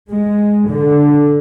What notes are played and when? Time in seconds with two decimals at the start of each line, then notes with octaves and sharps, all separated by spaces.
0.10 G#3
0.68 D3